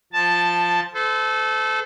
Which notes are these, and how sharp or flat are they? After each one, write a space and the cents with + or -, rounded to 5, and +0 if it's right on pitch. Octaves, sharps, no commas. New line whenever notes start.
F3 +0 A5 +0
A4 -20 C5 -40